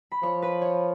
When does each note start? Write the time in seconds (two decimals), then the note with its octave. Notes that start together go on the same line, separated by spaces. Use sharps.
0.12 B5
0.23 F3 C#5 C#6
0.42 B4 B5
0.61 C#5 C#6